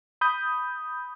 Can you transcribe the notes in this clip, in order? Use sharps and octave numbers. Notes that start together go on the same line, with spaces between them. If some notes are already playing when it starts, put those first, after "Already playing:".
B5 D#6 G6